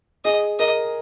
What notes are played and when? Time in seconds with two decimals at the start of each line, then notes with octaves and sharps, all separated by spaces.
0.25 G#4 D#5
0.59 A#4 D#5